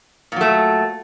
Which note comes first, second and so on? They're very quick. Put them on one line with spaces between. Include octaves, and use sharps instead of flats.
A#2 F#3 A3